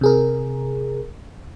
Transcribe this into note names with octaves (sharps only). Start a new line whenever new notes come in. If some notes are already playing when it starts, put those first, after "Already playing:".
C3 G#4 A#4